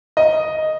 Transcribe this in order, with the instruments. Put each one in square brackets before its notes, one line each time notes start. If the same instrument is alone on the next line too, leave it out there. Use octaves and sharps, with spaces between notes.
[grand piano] D#5